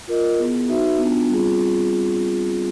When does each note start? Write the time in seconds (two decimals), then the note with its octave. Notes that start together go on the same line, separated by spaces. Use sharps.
0.08 F4 A#4 D#5
0.38 B3 E4 G#4
0.68 D#4 F#4 B4 E5
0.98 B3 D4 F4
1.29 G3 C4 F4 G#4